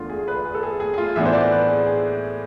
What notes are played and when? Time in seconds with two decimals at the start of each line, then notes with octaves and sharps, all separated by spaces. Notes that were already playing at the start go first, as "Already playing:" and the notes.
Already playing: E2 D3 A3 F4
0.10 G#4
0.28 B4
0.45 G#4
0.54 A4
0.63 G#4
0.80 G#4
0.94 G#4
0.98 F4
1.16 A2 E3 B3 D4 E5
1.25 C5
1.33 D5
1.51 B4
1.68 G#4
1.86 G#4